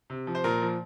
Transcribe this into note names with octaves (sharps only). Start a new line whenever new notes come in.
C3
F3
C5
A#2 A#4
F3